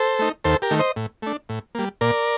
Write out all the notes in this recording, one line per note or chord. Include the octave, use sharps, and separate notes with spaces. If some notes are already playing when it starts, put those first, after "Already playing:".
Already playing: A4 C5
A3 D#4
D#2 A4 C5
G4 A#4
D#3 A3
C5 D#5
A2
A3 D4
A2
G3 A#3
A#2 A#4 D5